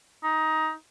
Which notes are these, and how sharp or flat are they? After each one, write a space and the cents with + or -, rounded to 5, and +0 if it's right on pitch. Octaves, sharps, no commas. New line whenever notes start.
D#4 +15